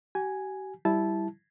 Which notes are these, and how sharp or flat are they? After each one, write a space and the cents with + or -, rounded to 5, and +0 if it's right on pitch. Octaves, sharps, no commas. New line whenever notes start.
G4 -45 G#5 +0
G3 +0 E4 +0 A5 -15